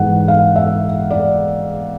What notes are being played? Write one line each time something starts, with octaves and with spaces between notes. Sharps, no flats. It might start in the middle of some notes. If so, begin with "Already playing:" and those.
Already playing: G#2 E3 F#5
F5
E5
D5